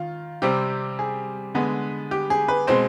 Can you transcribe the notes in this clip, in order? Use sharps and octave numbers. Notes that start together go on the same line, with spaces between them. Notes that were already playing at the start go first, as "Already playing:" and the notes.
Already playing: D#3 F4
C3 G3 C4 G4
G#4
D3 G#3 B3
G4
G#4
B4
B2 G#3 C4 C5